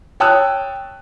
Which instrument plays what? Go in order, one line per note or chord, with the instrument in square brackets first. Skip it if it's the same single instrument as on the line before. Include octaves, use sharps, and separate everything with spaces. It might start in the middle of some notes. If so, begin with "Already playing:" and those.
[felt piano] C#5 G5 A5 D#6 E6 F#6